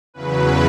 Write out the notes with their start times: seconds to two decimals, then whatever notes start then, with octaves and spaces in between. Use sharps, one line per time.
0.14 E2 C#3 F#3 B4